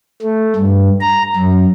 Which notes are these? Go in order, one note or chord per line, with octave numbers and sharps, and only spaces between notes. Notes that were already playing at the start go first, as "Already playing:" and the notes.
A3
G2
A#5
F#2